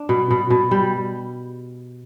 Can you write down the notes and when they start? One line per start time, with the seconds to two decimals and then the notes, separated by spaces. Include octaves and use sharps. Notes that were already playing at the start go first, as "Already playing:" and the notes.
Already playing: D4
0.09 B2
0.31 B2
0.50 B2
0.71 G3